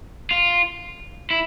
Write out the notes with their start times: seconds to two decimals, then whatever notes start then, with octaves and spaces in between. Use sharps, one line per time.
0.31 F4
1.30 E4